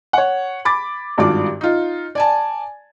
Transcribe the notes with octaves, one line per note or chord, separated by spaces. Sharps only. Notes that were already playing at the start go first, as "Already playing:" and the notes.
C#5 F#5
B5 D6 A6
G#1 G2 F4 F#4 D5 D6
D#4 F4
D5 G#5 A5